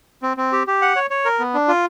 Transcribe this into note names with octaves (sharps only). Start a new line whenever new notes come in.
C4
C4
G4
G4
F#5
C#5
C#5
A#4
B3
D4
F4